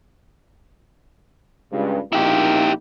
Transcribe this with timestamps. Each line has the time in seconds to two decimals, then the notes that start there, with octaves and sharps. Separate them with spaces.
1.72 C#2 G2
2.13 A#1 A#3 D#4 E4 G4